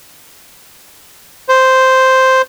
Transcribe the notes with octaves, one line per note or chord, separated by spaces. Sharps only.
C5